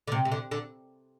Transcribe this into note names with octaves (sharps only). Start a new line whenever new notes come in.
D3
C3
C3
D3
D3